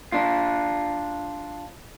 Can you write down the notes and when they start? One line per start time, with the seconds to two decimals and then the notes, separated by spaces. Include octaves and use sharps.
0.12 D4 F4